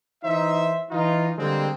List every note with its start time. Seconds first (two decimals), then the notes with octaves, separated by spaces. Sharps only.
0.24 E3 D#4 C5 E5
0.91 E3 D#4 F4
1.38 D3 G3 G#3 A#3 C4